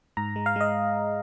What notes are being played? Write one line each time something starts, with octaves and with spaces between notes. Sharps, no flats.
G#2 A#5
G#3
F5
G#3 D#5